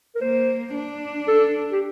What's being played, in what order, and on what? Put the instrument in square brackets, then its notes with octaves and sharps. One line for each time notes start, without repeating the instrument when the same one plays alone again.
[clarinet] A#4
[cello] A#3 [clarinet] C5
[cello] D4
[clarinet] A4
G4